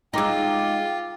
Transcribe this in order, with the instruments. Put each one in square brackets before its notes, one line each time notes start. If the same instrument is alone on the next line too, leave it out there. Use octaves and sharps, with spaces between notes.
[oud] G#3 D#4 [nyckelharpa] F4 [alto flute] G5 [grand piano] A#5 D6 E6